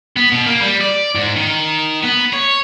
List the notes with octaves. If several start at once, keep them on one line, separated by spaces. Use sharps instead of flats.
B3
B2
A#3
G3
D5
G#2
D#3
B3
C#5